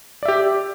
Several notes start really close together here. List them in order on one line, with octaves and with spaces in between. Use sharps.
D5 E5 G4